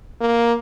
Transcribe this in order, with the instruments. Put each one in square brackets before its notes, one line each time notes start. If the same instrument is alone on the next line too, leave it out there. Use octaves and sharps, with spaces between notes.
[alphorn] A#3